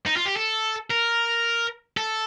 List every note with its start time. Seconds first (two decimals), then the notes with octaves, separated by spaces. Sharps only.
0.06 D#4
0.16 F4
0.26 G4
0.36 A4
0.90 A#4
1.97 A4